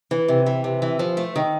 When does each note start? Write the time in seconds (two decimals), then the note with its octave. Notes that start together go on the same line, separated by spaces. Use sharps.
0.11 E3
0.28 C3
0.46 E3
0.64 C3
0.82 E3
0.99 F3
1.17 A3
1.36 D#3